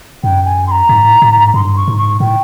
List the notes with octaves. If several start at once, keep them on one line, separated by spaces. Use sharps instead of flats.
F#2 G5
G#5
C6
A#5
G#2
A2
A2
G#2
G2 C6
C#6
G#2
C#6
A2 G5